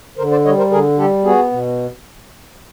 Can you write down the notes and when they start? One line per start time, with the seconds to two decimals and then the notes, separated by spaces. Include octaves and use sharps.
0.18 D3 A#4 C5
0.31 C5 D5
0.45 G3 C#5 D#5
0.58 A#4 C5
0.71 D3 G#4 A#4
0.98 G3 G4 A4
1.24 B3 F#4 G#4
1.51 B2